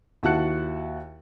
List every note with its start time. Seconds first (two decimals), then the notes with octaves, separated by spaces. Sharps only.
0.23 D#2 E4 F#4 A5 F#6 C#7